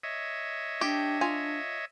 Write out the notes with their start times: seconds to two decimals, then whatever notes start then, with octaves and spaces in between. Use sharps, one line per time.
0.03 C#5 D#5 E5
0.81 D4 G4
1.21 F4 G#5